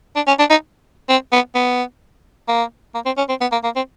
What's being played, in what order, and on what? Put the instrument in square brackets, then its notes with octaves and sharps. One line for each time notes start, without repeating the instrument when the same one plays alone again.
[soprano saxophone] D4
C#4
D4
D#4
C4
B3
B3
A#3
A#3
C4
C#4
C4
B3
A#3
A#3
C4